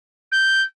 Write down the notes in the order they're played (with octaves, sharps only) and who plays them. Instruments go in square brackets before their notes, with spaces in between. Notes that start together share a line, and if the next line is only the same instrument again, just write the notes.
[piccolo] G6